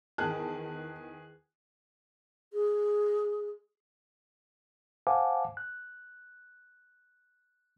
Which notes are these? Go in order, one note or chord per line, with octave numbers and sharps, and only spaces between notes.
E2 D#3 G#4 A5 F#6
G#4
C5 F5 F#5 G#5 A5 D6
F#6